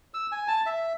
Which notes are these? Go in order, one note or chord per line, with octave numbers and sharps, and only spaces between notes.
E6
G#5
A5
E5